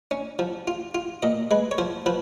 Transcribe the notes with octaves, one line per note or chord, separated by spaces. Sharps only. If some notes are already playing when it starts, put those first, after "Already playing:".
C#4
F3
F4
F4
A#2 D#5
G#3 B4
C#5
F3 C5
F3 B4